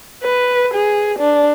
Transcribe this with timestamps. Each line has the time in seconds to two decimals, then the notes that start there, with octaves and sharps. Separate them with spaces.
0.23 B4
0.74 G#4
1.19 D4